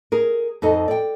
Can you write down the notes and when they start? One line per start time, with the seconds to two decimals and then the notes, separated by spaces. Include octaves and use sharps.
0.12 G#4 A#4
0.62 F2 D#4 A4 D#5
0.88 D5 G5